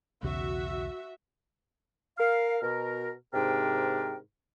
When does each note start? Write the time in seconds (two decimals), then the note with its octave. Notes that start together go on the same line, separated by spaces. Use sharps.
0.23 B1 E2 C#3 F#4 E5
2.18 A#4 F5
2.62 B2 A#4
3.34 G#2 C3 D4 A#4 G5